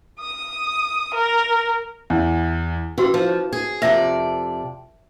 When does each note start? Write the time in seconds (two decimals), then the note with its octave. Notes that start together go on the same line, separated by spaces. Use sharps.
0.19 D#6
1.14 A#4
2.10 E2
2.98 E3 C#4 F#4 B4
3.14 F3
3.29 C5
3.53 G#4
3.82 F2 C3 A#4 D5 E5